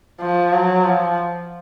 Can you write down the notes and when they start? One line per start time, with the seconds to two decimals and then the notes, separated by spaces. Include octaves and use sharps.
0.21 F3
0.52 F#3
0.84 F3